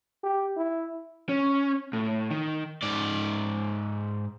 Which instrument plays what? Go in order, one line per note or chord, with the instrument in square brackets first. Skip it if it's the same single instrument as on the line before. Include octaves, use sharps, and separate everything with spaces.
[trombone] G4
E4
[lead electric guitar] C#4
A2
D#3
[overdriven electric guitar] G#2 D5